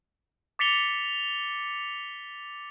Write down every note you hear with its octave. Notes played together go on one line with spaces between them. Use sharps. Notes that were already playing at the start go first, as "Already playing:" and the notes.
D6 A6 B6 C#7 F7 G7